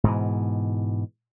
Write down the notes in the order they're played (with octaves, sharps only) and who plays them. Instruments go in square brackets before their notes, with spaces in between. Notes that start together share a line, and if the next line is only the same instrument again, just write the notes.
[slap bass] G#2 B2 E3